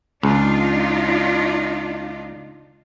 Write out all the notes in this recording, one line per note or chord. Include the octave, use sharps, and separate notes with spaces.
C#2 D4 D#4 F4